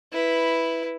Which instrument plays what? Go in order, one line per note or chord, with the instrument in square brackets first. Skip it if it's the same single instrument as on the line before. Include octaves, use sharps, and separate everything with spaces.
[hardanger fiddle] E4 B4